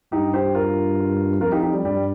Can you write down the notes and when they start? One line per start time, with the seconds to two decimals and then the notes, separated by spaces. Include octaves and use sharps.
0.12 G2 D#4 G4
0.34 G4 C5
0.55 F4 A#4
1.41 F2 F4 A#4
1.52 D#4 G4
1.63 D#4 G4
1.73 G3
1.84 G2 G3